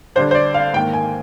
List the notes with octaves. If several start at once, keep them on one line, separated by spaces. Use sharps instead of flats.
D3 G3 D4 C5
C5
D5
F5
G#2 D#3 A#3 G5
G#5